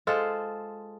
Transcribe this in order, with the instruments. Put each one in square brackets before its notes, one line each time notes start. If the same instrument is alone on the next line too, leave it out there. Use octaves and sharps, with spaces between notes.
[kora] G#3 F4 A4 C5